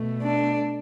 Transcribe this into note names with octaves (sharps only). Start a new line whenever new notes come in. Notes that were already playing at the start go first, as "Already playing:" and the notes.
Already playing: B2 A3
D4